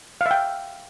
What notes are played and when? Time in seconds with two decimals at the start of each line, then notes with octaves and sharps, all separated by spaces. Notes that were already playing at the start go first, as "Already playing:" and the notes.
0.21 F5
0.26 E5
0.31 G5